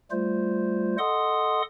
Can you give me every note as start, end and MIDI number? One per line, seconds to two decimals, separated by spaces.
0.11 0.96 55
0.11 0.96 57
0.11 0.96 65
0.11 0.96 72
0.98 1.62 69
0.98 1.62 75
0.98 1.62 78
0.98 1.62 84
0.98 1.62 87